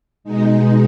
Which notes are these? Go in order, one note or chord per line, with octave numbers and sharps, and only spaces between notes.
B2 G#3 D#4